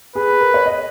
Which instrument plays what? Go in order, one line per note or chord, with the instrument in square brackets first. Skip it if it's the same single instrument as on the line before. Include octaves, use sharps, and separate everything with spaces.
[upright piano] G#4 [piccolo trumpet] B4
[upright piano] A#4
C#5
D#5